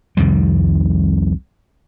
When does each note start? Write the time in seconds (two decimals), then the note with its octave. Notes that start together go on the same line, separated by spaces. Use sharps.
0.17 C2 F2 D#3 G3